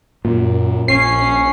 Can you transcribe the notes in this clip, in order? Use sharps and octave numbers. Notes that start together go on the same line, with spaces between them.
F#2 A#2
A#1 C#4 C7